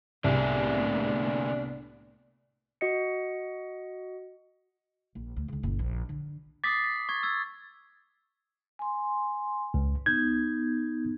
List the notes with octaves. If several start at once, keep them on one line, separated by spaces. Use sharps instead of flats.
C2 A2 D3 A#3 B3 D4 G#4
F#4 D#5 C#7
A#1
D2
C#2 D3
F#1 A#2
A#1
D3
D6 D#6 A6 B6 C7
B6
C#6 G#6
E6 G#6
G#5 C6
C#2
B3 D#4 G6 G#6